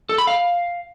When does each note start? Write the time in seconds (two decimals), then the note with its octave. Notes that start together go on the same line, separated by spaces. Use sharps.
0.09 A4
0.18 B5
0.27 F5